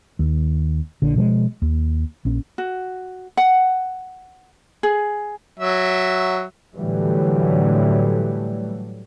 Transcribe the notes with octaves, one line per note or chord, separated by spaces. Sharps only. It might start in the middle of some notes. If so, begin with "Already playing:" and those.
D#2
A#1 D3
B2 F3 G3 G#3
D#2
A#1 C#4
F#4
F#5
G#4
F#3 E5
A2 D3 E3 F#3 G3 A3